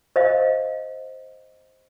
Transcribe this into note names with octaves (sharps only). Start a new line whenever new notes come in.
C5 D#5 F5